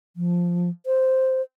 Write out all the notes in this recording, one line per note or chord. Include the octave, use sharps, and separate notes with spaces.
F3
C5